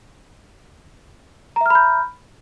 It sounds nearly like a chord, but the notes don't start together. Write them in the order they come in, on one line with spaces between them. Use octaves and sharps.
A#5 E5 F6 B5 G6